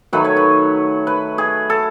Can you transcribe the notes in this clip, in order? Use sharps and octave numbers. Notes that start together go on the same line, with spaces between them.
D#3 F#3 A3 B4
C#5
B4
B4
G#4
A4